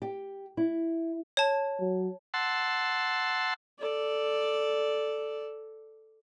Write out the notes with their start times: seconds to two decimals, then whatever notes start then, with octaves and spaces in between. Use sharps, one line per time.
0.02 G4
0.57 E4
1.37 C#5 A5
1.80 F#3
2.34 F#5 A5 C6 E6
3.79 A4 D5